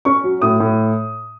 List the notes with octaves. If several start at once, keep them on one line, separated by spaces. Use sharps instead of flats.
C#4 C#6
F#3
A2 D#6
A2